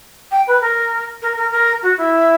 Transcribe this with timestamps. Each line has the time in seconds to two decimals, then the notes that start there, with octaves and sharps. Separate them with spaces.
0.31 G5
0.47 B4
0.61 A#4
1.22 A#4
1.36 A#4
1.51 A#4
1.82 F#4
1.97 E4